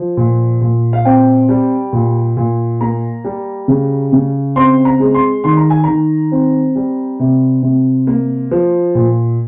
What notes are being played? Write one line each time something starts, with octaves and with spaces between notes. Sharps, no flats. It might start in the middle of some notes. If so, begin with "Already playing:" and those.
Already playing: F3
A#2
A#2
F5
C4 G5
G3
A#2
A#2
A#3 A#5
G3
C#3
C#3
C4 C6
A#5
G#3
C6
D#3 C6
A#5
G#5
D#3 A#5
C4
G3
C3
C3
A#3
F3
A#2